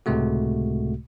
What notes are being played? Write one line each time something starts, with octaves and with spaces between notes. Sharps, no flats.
C#2 A2 C3 G#3 A3 F#4